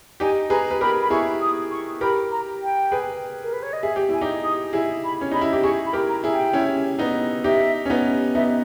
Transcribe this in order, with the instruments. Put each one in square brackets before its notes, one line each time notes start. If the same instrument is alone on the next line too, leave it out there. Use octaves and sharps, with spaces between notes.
[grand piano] D#4 G4 [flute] G#5
[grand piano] G#4 B4 [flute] A#5
[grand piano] B4
[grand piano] G4 A#4 [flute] B5
[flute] B5
[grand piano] E4 G#4 [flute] C#6
[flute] D#6
C#6
[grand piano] G4 A#4 [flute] B5
[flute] A#5
G5
[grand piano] G#4 B4
[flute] A#4
B4
C#5
D#5
[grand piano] G#4 [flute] E5
[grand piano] G4
[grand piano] E4 [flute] G#5
[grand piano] D#4 G4
[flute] D#6
[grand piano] E4 G#4
[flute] B5
[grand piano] C#4
[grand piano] D#4 [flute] B5
[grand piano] E4
G4
[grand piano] E4 G#4 [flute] C#6
[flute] B5
[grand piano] G4 A#4
[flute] A#5
[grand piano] E4 G#4
[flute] G5
[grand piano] C#4 E4
B3 D#4
[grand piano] D#4 G4 [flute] E5
[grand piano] C#4
B3 D#4
[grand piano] B3 D#4 [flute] E5